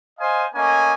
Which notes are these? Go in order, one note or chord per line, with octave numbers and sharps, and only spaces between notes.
C5 D#5 F5 G#5
A3 A#3 C#4 D#5 G#5